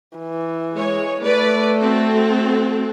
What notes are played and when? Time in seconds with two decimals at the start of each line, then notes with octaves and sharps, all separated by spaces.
0.18 E3
0.73 G#3 C#5
1.22 A3 B4 D5
1.78 C4 F#4 A4